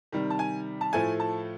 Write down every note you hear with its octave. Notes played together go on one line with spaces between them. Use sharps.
C3 D#3 G3
A5
G#5
A5
A2 F3 A3 G#5
A5